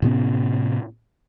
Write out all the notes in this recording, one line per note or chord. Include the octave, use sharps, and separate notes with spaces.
A2 C3 B3 C#4